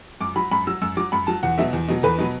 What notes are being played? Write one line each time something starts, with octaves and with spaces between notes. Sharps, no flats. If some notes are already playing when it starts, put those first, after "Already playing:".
F#2 D6
F#3 B5
F#2 B5
F#3 E6
F#2 E6
F#3 D6
F#2 B5
F#3 A5
E2 F#5
B2 F#3 E5
E2
B2 F#3
E2 B4
B2 F#3